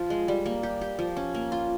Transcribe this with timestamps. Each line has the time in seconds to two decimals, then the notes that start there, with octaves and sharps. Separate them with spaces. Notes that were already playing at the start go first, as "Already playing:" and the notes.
Already playing: F3 F4
0.10 G#3
0.28 G3
0.46 A#3
0.63 G4
0.81 G4
0.99 F3
1.17 C#4
1.35 A#3
1.52 F4